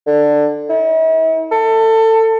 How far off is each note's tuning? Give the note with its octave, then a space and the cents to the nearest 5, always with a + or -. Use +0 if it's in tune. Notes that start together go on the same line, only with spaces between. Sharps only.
D3 +10
E4 -45
A4 +25